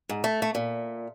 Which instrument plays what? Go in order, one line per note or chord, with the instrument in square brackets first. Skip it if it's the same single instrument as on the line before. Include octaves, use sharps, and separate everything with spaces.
[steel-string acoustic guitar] G#2
A3
A3
A#2